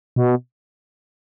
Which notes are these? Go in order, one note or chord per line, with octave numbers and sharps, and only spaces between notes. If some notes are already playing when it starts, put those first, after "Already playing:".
B2